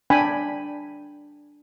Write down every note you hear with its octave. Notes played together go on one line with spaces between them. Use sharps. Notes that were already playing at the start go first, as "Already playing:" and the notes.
D4 G5 G#5 B5